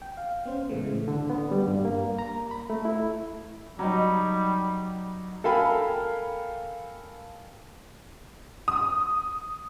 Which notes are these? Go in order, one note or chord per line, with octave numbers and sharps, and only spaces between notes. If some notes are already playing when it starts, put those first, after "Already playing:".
G5
F5
B3 C#4 C5
A2 C#3 E3 G#3 A3
D3
B3
G3
G2
A#3
A#5
B5
A3
E4
F#3 G3 D#4
A4 A#4 F5 G5 G#5 B5
D#6